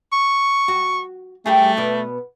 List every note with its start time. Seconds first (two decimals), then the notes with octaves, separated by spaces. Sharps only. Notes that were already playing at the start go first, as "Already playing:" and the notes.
0.13 C#6
0.68 F#4
1.46 G3 A3 G4 G#4
1.77 B2 B3 D5